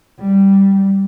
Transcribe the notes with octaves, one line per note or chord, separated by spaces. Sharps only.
G3